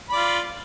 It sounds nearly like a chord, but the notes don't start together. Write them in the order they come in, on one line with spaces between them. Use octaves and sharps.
B5 D5 F4